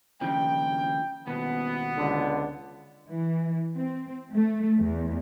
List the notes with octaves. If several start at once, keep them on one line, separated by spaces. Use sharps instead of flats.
D#2 C#3 F3 G5
D#2 B2 B3
C#2 D3
E3
C4
A3
E2